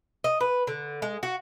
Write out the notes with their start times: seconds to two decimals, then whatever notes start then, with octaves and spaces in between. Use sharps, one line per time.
0.24 D#5
0.41 B4
0.67 D3
1.02 G#3
1.23 F#4